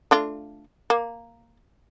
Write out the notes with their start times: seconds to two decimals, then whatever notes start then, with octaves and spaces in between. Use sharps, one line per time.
0.11 A3 D4 F4
0.90 A#3